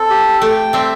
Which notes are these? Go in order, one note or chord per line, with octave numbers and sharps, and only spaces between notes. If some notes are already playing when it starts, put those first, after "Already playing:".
Already playing: C4 A4
G4
A3 G5
G3 C4 E5